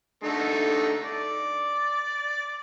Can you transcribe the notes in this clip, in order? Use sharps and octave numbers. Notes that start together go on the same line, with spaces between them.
D3 A3 D#4
D5